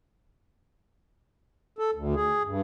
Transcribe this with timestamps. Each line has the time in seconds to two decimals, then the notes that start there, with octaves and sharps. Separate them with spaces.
1.79 A4
1.95 D2
2.15 G#4
2.45 G2